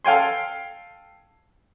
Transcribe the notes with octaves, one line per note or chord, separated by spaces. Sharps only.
A4 F5 G5 G#5 C6